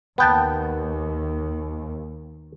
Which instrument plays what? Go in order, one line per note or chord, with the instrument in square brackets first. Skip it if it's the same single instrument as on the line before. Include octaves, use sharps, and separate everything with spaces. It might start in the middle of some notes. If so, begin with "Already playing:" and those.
[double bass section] D#2 [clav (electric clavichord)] B3 G5 A5